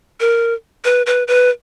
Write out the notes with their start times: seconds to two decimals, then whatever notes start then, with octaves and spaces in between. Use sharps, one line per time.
0.20 A#4
0.85 B4
1.06 B4
1.28 B4